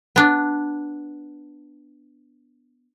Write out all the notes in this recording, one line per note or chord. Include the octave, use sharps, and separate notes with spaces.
B3 D4